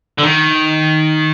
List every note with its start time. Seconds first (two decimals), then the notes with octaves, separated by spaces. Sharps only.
0.18 D3
0.23 D#3